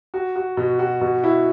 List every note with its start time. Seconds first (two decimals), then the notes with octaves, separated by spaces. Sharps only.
0.14 F#4
0.36 F#4
0.57 B2
0.79 F#4
1.01 B2
1.24 E4